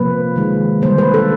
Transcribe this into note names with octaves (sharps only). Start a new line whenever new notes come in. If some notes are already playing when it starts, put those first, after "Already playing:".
Already playing: C3 F3 A#3 B4
D#3 G#3
D3 G3 A#3 C5
B4
A4